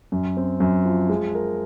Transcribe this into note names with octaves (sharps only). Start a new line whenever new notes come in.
F#2
C4
F#2
F3
G#3
A#4